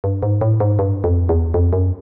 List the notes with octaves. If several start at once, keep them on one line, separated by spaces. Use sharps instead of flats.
G2
G#2
A2
G#2
G2
F2
E2
F2
F#2